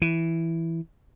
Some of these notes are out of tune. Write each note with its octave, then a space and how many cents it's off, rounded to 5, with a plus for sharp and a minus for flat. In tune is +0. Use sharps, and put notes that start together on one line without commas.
E3 +0